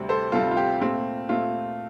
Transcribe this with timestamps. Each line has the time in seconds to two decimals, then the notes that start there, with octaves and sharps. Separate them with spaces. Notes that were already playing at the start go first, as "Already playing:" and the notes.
Already playing: D2 C3 G3 C4
0.09 A4 C5
0.32 D2 C3 G3 C4 F4 A4
0.51 F4
0.57 G4
0.81 A#2 A3 C4 F4
1.29 A#2 A3 C4 F4